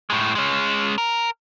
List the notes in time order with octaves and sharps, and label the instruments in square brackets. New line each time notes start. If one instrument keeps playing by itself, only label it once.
[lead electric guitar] A2 G#3
G#3 C#4
A#4